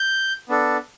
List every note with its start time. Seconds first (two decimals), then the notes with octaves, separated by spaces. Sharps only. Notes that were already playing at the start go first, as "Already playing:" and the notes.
Already playing: G6
0.49 B3 D4 A4